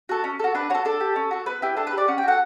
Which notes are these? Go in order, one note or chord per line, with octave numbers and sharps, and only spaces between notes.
F#4 A4
C#4
F#4 A4
D4 B4
F#4 A4 C#5
D4 A4
G4
C#4
F#4 A4
B3 B4
E4 G4
D4 A4
B4
G4 D5
C#4 F#5
G5
F#4 A4 F#5